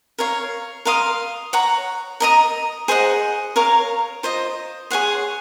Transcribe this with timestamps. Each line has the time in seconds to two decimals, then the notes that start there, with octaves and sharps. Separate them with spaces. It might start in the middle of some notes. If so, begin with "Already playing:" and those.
0.18 A#4 C#5 F5
0.85 A#4 F5 C6 D#6
1.53 C#5 F#5 A#5
2.20 A#4 D#5 A#5 D#6
2.88 G#4 C5 D#5 F#5
3.56 A#4 C#5 F5 A#5
4.23 F4 C5 D#5
4.91 G#4 C#5 F#5 C6